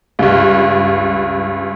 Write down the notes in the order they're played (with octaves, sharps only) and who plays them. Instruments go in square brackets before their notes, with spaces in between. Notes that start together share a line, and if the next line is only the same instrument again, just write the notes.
[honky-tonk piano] C#2 G2